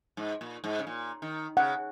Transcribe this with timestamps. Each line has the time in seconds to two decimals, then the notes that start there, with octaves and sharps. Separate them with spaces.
0.17 G#2
0.41 A#2
0.64 G#2
0.79 C#3
0.87 A#2
1.22 D#3
1.57 C#3 F#5